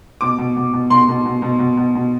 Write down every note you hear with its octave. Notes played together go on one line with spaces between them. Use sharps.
B2 D6
B2
B2
B2
B2 C6
B2
B2
B2
B2
B2
B2